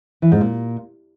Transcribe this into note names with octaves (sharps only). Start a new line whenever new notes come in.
E3
G#2
A#2